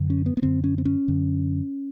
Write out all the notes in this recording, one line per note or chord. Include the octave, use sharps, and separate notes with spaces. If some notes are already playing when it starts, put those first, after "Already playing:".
Already playing: F#2 D3
C#4
B3
B3
F#2 D3 C4
C#4
C4
C#4
F#2 D3